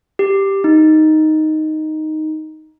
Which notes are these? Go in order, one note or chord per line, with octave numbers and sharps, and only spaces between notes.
G4
D#4